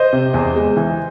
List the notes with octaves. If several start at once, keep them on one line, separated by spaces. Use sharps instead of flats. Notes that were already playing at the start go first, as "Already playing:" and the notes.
Already playing: C5 D#5
C3
E2
G#3
E3